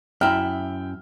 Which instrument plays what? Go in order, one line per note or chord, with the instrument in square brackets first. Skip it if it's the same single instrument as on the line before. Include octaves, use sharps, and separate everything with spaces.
[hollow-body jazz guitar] F#2 E4 [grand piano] E5 G5 F6